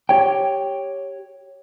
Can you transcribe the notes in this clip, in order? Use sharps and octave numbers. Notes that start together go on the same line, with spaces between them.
G4 C#5 G5